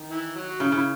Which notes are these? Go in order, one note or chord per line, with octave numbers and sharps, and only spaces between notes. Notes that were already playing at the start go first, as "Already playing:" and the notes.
Already playing: D#3
E3
F#3
F#4
C#3 E4
C#3 E4